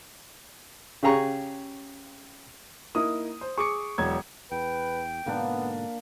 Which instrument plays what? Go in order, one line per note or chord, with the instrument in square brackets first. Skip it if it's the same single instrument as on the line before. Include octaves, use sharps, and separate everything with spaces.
[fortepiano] C#3 G4 G#4 A#5 C#6
[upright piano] A#3 D#4 E4 [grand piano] D#6
[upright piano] C5
[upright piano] G#4 [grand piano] C#6 D6 C#7
[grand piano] E1 G#6 [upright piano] F#3
[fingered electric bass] E2 [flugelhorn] B4 [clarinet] G5
[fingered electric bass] G#2 B2 D3 [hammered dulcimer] A#3 D4 [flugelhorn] B3